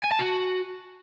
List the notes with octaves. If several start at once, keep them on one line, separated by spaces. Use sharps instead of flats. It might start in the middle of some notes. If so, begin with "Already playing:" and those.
G#5
A5
F#4